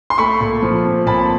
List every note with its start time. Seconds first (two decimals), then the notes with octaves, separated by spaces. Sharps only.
0.10 C6
0.18 A3 B5 C#6
0.41 A#2
0.63 F3
0.84 C4
1.06 A#2 A5 B5